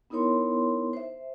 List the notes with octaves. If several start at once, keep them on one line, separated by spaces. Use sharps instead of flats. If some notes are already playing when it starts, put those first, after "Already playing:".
B3 D#4 E4 A#4 C#5 C6
C5 E5